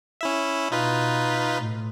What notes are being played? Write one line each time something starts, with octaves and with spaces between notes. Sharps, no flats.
C#4 E4 E5
B2 D#4 F4 B4
A2